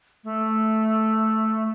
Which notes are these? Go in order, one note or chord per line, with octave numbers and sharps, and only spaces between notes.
A3